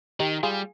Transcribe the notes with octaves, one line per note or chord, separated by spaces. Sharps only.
D#3 D#4 G4
G3 F4 G#4